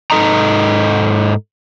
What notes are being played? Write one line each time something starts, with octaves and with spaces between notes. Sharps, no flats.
G#2 D#4 A4 D#5 A#5